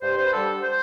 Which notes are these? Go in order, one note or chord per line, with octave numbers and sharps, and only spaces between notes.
G2 C5
C5
B4
D3 G3 A4
C5